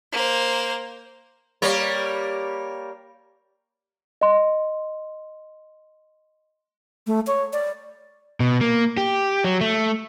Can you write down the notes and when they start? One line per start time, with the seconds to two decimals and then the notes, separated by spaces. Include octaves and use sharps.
0.13 A#3 C5
1.62 G3 A#3 C#5
4.21 D#5 C6
7.07 A3
7.27 C#5
7.53 D5
8.40 B2
8.61 A#3
8.97 G4
9.44 F#3
9.61 A3